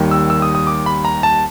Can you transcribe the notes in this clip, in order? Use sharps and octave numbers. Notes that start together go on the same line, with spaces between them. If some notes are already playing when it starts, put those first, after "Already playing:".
Already playing: D#2 D#3 G3
E6
E6
D#6
D#6
D6
B5
A#5
A5